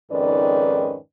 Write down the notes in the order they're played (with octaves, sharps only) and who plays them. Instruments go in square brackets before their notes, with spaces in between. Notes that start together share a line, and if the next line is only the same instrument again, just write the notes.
[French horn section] F2 G#2 D#3 C#4 B4 D5